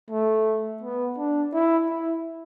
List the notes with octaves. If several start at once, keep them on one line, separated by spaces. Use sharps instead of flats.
A3
B3
D4
E4
E4